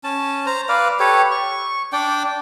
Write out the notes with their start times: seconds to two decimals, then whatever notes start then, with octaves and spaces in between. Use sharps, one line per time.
0.04 C#4 A5
0.46 C5 A#5
0.69 B4 D5 F5
1.00 G4 A4 B4 C#5
1.31 C#6
1.93 D4 D5 G5